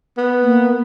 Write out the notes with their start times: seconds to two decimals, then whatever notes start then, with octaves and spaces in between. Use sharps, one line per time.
0.18 B3
0.43 A#3